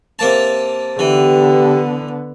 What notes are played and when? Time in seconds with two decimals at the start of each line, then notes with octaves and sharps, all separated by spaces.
0.19 C3 A#3 A5
0.99 D3 E3 B3 G4